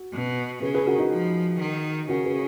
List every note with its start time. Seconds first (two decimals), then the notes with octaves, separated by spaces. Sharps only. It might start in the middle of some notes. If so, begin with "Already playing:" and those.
Already playing: F#4
0.13 B2
0.62 C#3 G#4 B4
0.74 G#4 B4
0.86 F#4 A#4
0.98 D#4 F#4
1.11 F3
1.60 D#3
2.09 C#3 F#4 A#4
2.25 G#4 B4